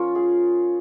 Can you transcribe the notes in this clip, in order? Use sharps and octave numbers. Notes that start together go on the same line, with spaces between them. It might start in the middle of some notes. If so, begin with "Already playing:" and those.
Already playing: F3 C#4 F4 A#4 C#5
G#4